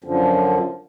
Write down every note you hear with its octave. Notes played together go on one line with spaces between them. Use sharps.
F#2 D3 F3